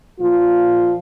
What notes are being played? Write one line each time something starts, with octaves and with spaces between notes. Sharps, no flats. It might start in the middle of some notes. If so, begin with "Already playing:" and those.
A#2 F3 F4